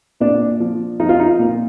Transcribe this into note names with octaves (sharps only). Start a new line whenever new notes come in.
A#2 D4
F3
F3 D#4
F4
D#4
A#2